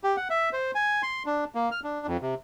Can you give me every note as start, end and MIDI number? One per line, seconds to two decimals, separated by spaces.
0.04 0.16 67
0.16 0.28 78
0.30 0.50 76
0.53 0.71 72
0.75 1.02 80
1.03 1.23 84
1.26 1.44 62
1.55 1.70 58
1.71 1.80 89
1.84 2.07 62
2.07 2.17 41
2.22 2.35 48